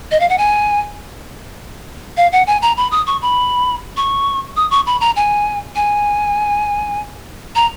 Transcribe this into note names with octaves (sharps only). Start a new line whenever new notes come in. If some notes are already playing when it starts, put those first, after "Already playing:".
D#5
F5
F#5
G#5
F5
F#5
G#5
A#5
B5
D#6
C#6
B5
C#6
D#6
C#6
B5
A#5
G#5
G#5
A#5